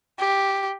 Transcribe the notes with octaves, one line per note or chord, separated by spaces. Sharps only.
G4